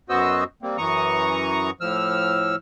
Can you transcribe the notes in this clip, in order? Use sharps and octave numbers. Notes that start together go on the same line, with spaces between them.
F#2 B3 F#4 C5 D#5 E6
G3 A#3 C4
F#2 E3 A#5 C#6 D#6
A2 F3 E6 F6